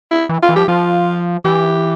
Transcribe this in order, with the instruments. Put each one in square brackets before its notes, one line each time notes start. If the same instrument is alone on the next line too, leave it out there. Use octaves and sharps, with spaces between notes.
[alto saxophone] E4
[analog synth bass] E3
[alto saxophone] F4
[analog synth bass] E3
[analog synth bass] F3 [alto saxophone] G4
[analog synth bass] F3 [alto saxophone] F4
[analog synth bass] E3 [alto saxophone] G4